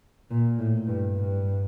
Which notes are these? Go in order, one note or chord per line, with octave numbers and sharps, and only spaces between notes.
A#2
A2
G2
G2